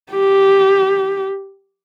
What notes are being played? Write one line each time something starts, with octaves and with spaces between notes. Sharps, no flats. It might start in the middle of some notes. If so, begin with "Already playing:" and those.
G4